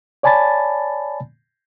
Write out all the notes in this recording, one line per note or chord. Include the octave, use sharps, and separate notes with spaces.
C#5 D5 G#5 A5 B5 A6